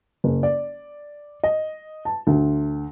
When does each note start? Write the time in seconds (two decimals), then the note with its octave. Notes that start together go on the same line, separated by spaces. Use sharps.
0.24 F#1
0.43 D5
1.44 D#5
2.05 A5
2.27 D2